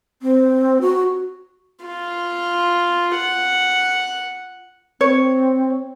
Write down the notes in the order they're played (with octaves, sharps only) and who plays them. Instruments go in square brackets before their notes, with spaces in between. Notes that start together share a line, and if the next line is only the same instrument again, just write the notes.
[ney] C4
F#4
[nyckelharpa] F4
F#5
[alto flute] C4 [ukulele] C#5